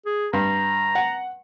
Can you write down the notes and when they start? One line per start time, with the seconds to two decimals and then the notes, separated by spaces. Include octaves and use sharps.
0.06 G#4
0.33 G2 A#5
0.95 F#5